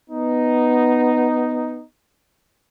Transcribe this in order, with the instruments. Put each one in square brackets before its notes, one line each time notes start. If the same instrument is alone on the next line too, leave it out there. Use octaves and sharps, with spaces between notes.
[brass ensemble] B3 D#4